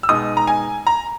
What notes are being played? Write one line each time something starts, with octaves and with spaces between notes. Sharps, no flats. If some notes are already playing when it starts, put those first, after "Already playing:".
E6
B2 G#3 D#4 D#6
A#5
G#5
A#5